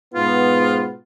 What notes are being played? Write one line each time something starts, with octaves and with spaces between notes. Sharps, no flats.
G#2 B2 B3 F4